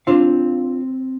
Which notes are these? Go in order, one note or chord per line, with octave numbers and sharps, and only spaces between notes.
C4 D4 F4 F5